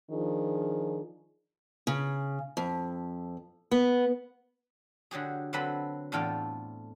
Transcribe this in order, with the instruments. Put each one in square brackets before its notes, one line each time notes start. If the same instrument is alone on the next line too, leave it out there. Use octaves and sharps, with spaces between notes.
[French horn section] D#3 F3 D4 G#4
[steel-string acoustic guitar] C#3
F2
B3
[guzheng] D3 F#3 G4 G#4
D3 F#3 C4 A4 B4 B5
E2 A2 D4 F4 A4 G5